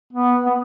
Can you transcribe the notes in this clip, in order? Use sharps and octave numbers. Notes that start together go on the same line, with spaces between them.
B3
B3